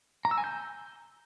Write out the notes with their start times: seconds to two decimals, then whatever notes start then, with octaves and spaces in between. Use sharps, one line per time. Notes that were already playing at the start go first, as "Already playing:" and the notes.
0.25 A#5
0.31 E6
0.38 G#5
0.44 G6